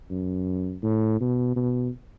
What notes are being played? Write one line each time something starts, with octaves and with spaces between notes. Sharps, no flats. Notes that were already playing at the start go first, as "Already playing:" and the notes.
F#2
A2
B2
B2